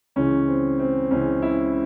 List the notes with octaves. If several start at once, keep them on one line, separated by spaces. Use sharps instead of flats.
C#2 C#3 E3 C#4
C4
C4
C#2 C#3 E3 C#4
E4